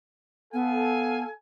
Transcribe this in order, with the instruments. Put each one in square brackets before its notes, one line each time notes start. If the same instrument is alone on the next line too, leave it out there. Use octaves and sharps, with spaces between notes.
[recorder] B3 [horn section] A4 F5 G#5